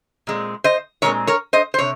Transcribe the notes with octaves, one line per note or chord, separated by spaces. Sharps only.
A#2 G#3 C4
C5 D#5
A#2 G#3 C4 A#4 C#5
A#4 C#5
C5 D#5
C5
C3 C#5